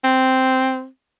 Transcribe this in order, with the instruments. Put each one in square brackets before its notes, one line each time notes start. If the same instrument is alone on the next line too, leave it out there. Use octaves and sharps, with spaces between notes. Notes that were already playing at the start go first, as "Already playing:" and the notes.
[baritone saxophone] C4